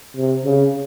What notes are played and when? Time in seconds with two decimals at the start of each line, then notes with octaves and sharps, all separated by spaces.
0.17 C3
0.45 C#3